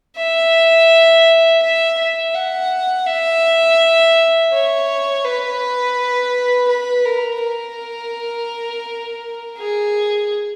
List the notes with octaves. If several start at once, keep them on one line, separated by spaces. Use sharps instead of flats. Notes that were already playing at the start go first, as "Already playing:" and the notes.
E5
E5
E5
F#5
E5
C#5
B4
B4
A#4
A#4
G#4